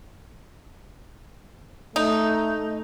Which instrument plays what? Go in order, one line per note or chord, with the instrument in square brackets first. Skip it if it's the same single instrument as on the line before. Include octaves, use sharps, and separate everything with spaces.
[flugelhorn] A3 [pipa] D#4